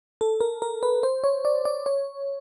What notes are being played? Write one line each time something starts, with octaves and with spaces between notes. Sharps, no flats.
A4
A#4
A#4
B4
C5
C#5
D5
D5
C#5